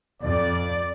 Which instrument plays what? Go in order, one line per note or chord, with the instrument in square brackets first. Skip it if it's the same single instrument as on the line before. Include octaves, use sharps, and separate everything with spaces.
[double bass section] F2 [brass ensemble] D5